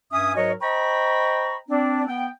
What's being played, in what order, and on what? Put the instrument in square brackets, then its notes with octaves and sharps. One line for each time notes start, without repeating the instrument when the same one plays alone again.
[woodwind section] G2 C#4 E5 G#5 D#6
G#2 F#3 F#4 A#4 C#5 D#5
C5 D#5 G5 A#5 B5 C#6
C4 D4
B3 G5